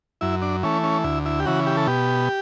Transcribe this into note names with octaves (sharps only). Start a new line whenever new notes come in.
F#2 E4
D4
E3 A3 C#4
C#4
D2 E4
E4
G4
C#3 E3 F#4
G4
A4
B2 G4